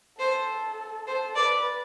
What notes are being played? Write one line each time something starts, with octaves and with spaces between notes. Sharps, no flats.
A4 C5
A4 C5
B4 D5